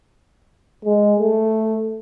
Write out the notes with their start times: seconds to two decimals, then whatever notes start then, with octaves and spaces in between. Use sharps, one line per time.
0.85 G#3
1.20 A3